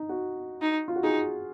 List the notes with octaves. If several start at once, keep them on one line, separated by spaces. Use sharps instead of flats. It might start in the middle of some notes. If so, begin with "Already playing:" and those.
Already playing: D#4
F#4
D#4
F4
F#4
D#4 G#4